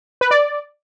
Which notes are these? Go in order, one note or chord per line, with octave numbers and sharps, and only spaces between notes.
B4
D5